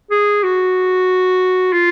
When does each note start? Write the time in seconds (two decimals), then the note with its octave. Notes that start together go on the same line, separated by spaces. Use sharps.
0.11 G#4
0.43 F#4
1.73 F4